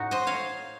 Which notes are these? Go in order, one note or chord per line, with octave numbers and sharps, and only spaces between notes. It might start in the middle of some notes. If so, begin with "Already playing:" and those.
Already playing: A2 D#4 F#4
C5 D#5
C#5 F5